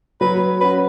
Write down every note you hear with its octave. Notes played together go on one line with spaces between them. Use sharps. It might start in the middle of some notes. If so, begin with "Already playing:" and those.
F#3 B4
C#4 F#4 B4